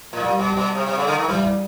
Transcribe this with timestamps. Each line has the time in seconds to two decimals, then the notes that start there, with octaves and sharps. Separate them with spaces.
0.13 A2
0.21 A#2 G3
0.39 B2
0.57 B2
0.75 C3
0.87 C3
0.98 C#3
1.07 D3
1.18 D#3
1.28 E3 G3